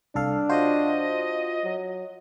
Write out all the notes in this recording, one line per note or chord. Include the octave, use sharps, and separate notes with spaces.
C2 D4 A4 F5
F4 F#4 C5 D#5
F#3